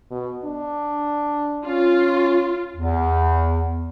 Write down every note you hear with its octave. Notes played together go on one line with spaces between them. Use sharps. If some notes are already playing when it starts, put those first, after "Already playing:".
B2
D4
C#4 F4
E2